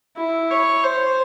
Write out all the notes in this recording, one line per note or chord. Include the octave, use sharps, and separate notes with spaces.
E4
C#5
C5